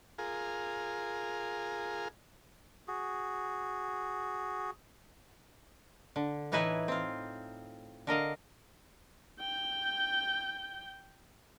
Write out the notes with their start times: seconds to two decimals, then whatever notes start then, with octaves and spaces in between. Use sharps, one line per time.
0.18 F4 G#4 A#4
2.88 F#4 G#4
6.16 D3
6.52 A2 E3 D#4 E4 B4 G#5
6.88 C4 F4
8.07 D3 A#4 D#5 F5
9.40 G5 G6